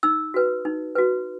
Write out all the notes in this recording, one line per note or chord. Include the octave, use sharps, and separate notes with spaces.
D#4 E6
F#4 B4
D#4
F#4 B4